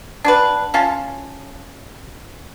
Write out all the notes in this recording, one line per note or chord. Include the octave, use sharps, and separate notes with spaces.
D4 F#4 B4
C#4 F4 F5 A5